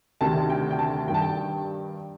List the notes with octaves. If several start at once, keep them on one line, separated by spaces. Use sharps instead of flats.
D2 C3 D#3 A5
G5
G5
A5
G2 D#3 G5
A5
G5